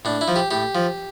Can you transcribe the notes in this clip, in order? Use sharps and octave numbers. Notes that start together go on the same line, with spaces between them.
A2 D4
E4
F3
G4
A2 G4
F3